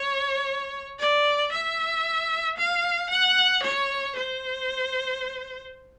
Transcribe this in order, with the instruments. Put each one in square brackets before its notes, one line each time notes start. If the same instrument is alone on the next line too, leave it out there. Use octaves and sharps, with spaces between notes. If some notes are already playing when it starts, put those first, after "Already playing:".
Already playing: [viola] C#5
D5
E5
F5
F#5
C#5
C5